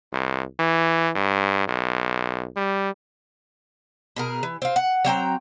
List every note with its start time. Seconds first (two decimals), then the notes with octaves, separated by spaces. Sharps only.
0.13 C2
0.59 E3
1.15 G2
1.68 B1
2.57 G3
4.16 B2 G#4 A#4
4.43 E3
4.62 C4 F4
4.76 F#5
5.05 F#3 C4 G5 A#5